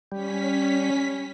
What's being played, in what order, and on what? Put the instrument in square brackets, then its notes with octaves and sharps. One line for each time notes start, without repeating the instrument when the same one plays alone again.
[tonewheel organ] G3 [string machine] C#4 B6